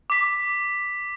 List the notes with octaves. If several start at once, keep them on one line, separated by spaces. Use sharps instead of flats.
D6 B6